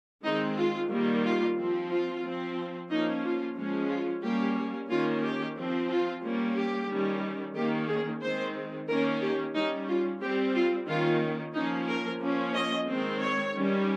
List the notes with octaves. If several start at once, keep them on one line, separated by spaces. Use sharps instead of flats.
D#3 G#3 C4 D#4
F4
D#3 G3 A#3
F4
F3 C4
F4
F3 C4
F3 A#3 C#4 D#4
F4
F3 G#3 C#4
F4
G3 A#3 C#4 G4
D#3 A#3 C#4 F4
G4
F3 C4
F4
G3 A#3 C#4
G4
D#3 G3 C#4
D#3 A#3 C#4 G4
G#4
D#3 G#3 C4 C5
D#3 A#3 C#4 A#4
G4
G3 C#4 D#4
F4
G3 C4 G4
F4
D#3 A#3 C#4 F4
F3 A#3 C#4 D#4
A#4
F3 A#3 C#4
D#5
D#3 G#3 C4
C#5
D#3 G3 C#4